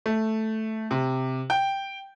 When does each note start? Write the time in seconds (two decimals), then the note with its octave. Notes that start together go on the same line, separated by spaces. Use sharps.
0.06 A3
0.91 C3
1.50 G5